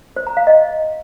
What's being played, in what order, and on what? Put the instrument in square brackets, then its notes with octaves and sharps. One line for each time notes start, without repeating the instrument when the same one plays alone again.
[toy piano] C5
A#5
F5
D#5